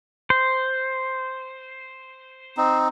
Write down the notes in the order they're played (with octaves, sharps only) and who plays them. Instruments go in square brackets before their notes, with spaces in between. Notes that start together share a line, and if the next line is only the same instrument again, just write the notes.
[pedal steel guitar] C5
[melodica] C4 D#4